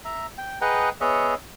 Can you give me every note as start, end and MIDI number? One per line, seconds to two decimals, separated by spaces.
0.05 0.27 76
0.05 0.27 82
0.38 0.59 79
0.61 0.89 68
0.61 0.89 71
0.61 0.89 75
0.61 0.89 78
0.61 0.89 79
0.61 0.89 82
1.01 1.35 59
1.01 1.35 68
1.01 1.35 73
1.01 1.35 75
1.01 1.35 76
1.01 1.35 78